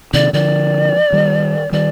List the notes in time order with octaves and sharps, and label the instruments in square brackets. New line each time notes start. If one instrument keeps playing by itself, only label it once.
[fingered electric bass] C3 D#3 [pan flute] D5
[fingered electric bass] D3 F3 [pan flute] D5
[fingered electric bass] D#3 G3
[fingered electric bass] D#3 G3 [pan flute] D5